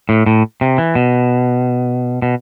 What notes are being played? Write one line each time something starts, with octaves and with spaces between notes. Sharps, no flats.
A2
A2
C3
E3
B2
B2